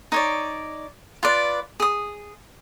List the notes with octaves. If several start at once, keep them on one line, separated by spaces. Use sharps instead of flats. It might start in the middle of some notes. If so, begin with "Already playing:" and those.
D#4 C#5 D5
F4 B4 D5
G#4 D#6